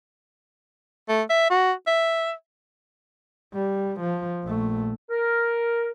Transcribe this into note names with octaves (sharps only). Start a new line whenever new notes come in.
A3
E5
F#4
E5
G3
F3
A#1 A3
A#4